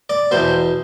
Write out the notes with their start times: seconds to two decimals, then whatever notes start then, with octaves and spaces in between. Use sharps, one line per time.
0.10 D5
0.31 E2 B2 C5